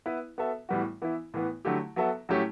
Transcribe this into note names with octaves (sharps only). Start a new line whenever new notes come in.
B3 E4 B4
B3 F#4 A4 E5
A2 E3 G3 B3 F#4
E3 B3 E4
A2 E3 B3
D3 F#3 A3 E4 G4
F#3 B3 F#4 A4 E5
A2 F#3 A3 C#4 G4